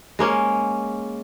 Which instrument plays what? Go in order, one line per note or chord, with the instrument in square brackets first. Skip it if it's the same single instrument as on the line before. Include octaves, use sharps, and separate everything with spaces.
[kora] G#3 A#3 C#4